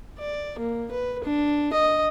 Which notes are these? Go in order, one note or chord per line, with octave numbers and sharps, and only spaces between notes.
D5
A#3
B4
D4
D#5